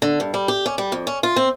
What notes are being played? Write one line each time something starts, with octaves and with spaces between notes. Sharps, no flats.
D3
G2
G3
G4
C#4
G3
F2
C#4
F4
C4